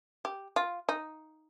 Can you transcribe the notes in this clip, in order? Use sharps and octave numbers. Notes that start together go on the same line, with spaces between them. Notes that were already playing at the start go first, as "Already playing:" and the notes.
G4
F4
D#4